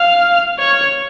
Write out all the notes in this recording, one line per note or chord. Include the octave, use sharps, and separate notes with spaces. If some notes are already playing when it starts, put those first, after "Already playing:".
Already playing: F5
C#5